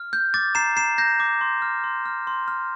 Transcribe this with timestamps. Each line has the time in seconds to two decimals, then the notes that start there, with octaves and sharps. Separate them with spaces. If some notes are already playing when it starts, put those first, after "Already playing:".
Already playing: F6
0.13 G6
0.34 D6 A6
0.55 A#5 C7 E7
0.76 A#5 C7 E7
0.98 G6 A#6
1.20 D6
1.41 C6
1.62 F6
1.84 C6
2.05 F6
2.27 C6
2.48 F6